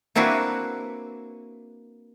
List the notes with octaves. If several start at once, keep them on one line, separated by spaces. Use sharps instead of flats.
A#3 C4 D4 E4 F#4 B4